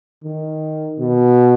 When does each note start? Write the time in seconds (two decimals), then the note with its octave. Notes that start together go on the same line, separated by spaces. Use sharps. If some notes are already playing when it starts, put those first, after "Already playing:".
0.24 D#3
0.99 B2